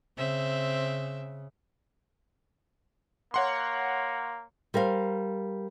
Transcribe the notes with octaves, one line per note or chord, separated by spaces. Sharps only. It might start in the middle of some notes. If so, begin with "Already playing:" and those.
C#3 C4 E5
A#3 C#5 F#5 C6
G3 A#4 C5 F5